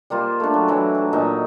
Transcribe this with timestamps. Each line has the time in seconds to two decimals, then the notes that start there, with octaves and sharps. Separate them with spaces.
0.10 G3 A#3 F4 C5
0.40 A3 D4
0.54 F#3
0.68 E3 F#3 E4
0.95 A3 A5
1.13 A#2 D#4 E5